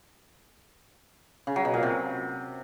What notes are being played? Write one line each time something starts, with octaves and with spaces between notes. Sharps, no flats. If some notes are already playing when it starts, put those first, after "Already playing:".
C#3
F#3
B2
A#2
C3